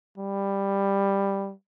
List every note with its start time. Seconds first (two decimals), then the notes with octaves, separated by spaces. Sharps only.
0.18 G3